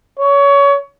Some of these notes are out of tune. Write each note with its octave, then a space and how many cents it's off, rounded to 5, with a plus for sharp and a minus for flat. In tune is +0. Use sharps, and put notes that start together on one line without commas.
C#5 +25